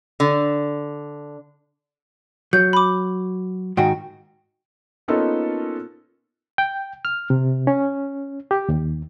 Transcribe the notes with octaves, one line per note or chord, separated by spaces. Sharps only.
D3
F#3 G6
B5 D6
G#2 D#3 F#4 G5
A#3 B3 C#4 D#4 F4 A4
G5
F6
C3
C#4
G4
D#2